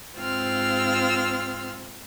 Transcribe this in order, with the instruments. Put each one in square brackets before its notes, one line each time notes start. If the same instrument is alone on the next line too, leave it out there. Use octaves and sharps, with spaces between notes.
[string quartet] G#2 C4 F4 E6 F6